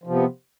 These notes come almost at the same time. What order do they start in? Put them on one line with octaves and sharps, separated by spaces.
F3 C3 B3